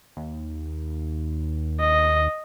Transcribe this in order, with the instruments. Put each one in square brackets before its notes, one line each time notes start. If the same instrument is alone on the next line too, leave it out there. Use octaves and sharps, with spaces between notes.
[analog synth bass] D#2
[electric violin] D#5